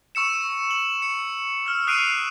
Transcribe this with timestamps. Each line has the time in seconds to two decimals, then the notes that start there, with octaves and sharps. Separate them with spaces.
0.15 C#6 E6 C#7 E7
0.71 F#7
1.02 C#7
1.66 E6 F6
1.87 D#6 F#6 C7 D7 D#7 F7